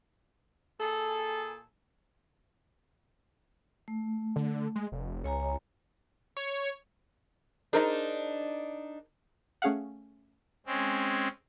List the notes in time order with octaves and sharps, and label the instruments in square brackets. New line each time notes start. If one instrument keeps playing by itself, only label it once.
[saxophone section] A#2 G#4 A4
[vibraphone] A3
[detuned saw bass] D3
G#3
F1
[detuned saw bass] C#2 [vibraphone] C#5 G#5 A#5
[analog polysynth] C#5
[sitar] D4 D#4 [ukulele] G#4 A#4 C5
[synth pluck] A3 C#4 G#4 F5 F#5
[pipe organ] G#3 C4 C#4